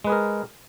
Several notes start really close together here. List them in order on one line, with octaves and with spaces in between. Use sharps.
G#3 B4 G#4 A#4